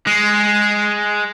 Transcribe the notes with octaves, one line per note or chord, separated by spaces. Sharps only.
G#3